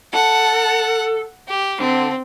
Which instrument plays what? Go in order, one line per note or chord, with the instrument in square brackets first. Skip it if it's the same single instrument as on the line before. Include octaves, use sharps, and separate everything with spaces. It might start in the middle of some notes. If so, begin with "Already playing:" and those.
[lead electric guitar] A4 [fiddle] F#5
[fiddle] G4
[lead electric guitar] D3 [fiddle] C4